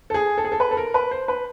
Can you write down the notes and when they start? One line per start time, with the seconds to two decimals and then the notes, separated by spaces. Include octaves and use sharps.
0.10 A4
0.14 G#4
0.38 A4
0.44 G#4
0.52 A4
0.60 B4
0.71 A4
0.77 A#4
0.94 B4
1.11 C5
1.28 B4